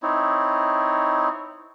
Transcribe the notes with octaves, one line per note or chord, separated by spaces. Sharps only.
C4 D#4 E4 C#5